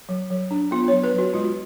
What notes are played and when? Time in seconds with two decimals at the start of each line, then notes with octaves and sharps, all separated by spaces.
0.09 F#3
0.30 F#3
0.51 D4
0.71 B3 F4
0.88 C#5
0.92 F#3
1.04 B4
1.13 F#3
1.18 F#4
1.34 G#3 F4